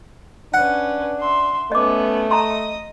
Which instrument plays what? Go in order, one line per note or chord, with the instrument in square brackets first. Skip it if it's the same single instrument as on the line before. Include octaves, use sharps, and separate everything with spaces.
[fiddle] C#4 B4 [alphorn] D4 [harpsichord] F#5
[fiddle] E5 C6
[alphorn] A3 [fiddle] B3 C#4 [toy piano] D#5 D6
[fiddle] D#5 D#6 [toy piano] A#5 C6